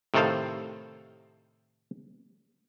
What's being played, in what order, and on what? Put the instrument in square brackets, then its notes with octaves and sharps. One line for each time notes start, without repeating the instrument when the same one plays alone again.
[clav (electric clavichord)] A2 C3 D#3 A4 C5 F5